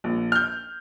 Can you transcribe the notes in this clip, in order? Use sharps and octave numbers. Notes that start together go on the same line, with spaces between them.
A#1
F6 G6